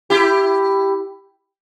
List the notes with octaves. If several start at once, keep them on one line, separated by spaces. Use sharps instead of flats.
E4 G4